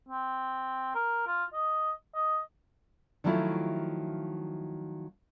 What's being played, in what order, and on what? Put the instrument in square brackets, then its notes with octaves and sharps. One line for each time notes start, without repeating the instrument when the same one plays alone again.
[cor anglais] C4
A#4
F4
D#5
D#5
[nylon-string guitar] D#3 F3 F#3 A3 E4 F4